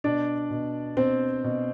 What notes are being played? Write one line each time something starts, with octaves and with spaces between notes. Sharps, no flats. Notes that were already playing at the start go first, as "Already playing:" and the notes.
B2 D4 D5
B2
B2 C4 C5
B2